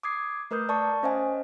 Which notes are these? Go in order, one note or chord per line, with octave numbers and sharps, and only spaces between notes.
D6 D#6 G#6 C7
A3 A#4 B4 D#6 G6
D5 A5 C#6
C#4 C5 D#5 F5 G#5